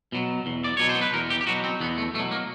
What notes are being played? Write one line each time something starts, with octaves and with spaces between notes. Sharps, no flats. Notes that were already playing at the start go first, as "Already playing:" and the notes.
B2 F#3
E2
D5
B2 F#3 C#5
C5
B4
E2 A#4
G4
G4
B2 F#3 F#4
C4
E2 B3
A3
B2 F#3 A3
A#3